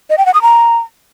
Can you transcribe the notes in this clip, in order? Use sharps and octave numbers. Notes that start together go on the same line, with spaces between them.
D#5
G5
F#5
D#6
A#5